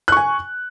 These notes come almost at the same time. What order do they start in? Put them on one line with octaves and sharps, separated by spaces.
F#6 C#6 G#5